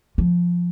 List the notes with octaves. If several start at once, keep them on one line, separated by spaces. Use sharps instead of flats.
F3